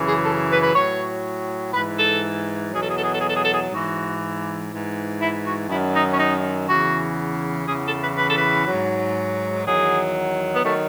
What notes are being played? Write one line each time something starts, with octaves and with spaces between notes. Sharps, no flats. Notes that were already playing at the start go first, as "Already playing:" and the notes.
Already playing: F#2 C#3 E3
G#4
A4
B4
B4
A2 F#3 C#5
G#2 E3 B4
A4
E2 B2 F#3 G#4
A4
G#4
A4
G#4
A4
G#4
A4
G#4
A4
G#4
G#2 E3 F#4
G#2 E3
E4
F#4
F#2 D#3 F#3 E4
D#4
C#4
D#4
E2 C#3 E3 F#4
E2 C#3 E3 G#4
A4
B4
B4
A4
B4
G#2 F#3
E2 D#3 F#3 G#4
B3
D#3 F#3 A3